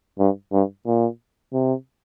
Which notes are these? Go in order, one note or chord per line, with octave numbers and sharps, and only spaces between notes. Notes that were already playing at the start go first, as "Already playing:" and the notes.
G2
G2
A#2
C3